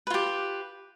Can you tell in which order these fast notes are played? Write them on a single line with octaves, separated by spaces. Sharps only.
B4 F4 G4